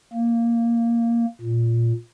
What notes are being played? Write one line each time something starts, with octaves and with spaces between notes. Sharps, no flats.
A#3
A#2